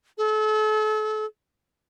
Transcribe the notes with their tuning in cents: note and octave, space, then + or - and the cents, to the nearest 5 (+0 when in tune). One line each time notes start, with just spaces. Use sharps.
A4 -35